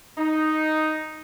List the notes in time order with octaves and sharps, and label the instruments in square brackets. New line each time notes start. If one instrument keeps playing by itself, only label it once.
[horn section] D#4